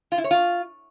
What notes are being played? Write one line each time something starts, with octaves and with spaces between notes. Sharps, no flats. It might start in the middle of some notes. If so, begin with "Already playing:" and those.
F4
E4
C#5
F4